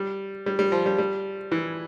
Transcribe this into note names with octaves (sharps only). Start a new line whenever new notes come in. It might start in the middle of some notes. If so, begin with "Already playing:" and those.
Already playing: G3
G3
G3
F3
G3
G3
E3